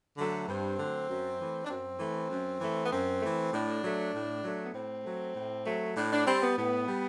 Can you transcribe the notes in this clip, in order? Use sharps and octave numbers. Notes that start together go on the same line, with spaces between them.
D3 F#3 A3
G2 C4
D3 F#3 A3
F#2
E3 A3
D4
F#2 C4
E3 A3
F#2
E3 A3
B3
F#2 C4
E3 A3
A2 D4
F#3 A3
A2
F#3 A3
B3
A2 C4
F#3 A3
A2
F#3 A3
A2 D4
D4
G3 C4
B3
A2 B3
G3